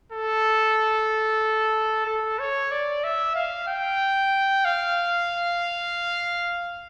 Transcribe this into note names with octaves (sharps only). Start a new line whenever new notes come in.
A4
A4
C#5
D5
E5
F5
G5
F5